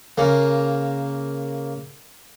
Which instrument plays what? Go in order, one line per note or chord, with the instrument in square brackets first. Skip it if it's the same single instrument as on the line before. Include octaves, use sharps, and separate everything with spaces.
[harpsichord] C#3 A#3